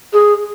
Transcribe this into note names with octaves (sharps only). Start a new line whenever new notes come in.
G#4